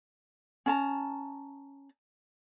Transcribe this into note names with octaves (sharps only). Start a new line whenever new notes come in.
C#4 A5 A#5